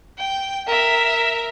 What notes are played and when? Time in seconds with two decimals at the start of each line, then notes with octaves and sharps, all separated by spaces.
0.18 G5
0.67 A#4 E5